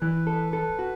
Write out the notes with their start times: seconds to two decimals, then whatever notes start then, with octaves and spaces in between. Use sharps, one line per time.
0.02 E3 B4
0.27 A4
0.53 A4
0.79 F#4